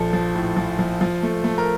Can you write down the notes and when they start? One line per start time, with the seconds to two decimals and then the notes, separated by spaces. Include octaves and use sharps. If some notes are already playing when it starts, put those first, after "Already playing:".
Already playing: A#1 F3 A4
0.13 F3
0.35 A2
0.57 F3
0.79 F3
1.01 F3
1.23 A3
1.44 A3
1.58 A#4